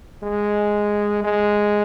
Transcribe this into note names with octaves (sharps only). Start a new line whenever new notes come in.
G#3
G#3